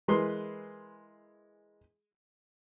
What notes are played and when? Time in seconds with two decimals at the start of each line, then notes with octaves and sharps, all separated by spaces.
0.08 E3 G#3 A#4 B4 C6